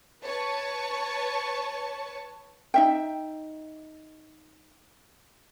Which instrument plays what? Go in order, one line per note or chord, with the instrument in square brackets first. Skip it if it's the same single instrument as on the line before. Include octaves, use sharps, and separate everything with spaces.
[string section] B4 C#5 A5 C#6
[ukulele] D#4 E5 G5